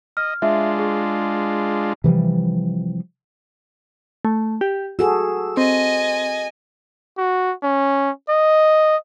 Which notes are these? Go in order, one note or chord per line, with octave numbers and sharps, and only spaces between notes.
D#5 F6
G#3 D4 F4 E5
G#4
C3 E3 F3 G3
A3
G4
F#4 G#4 A4 E6
C4 D#5 G#5
F#4
C#4
D#5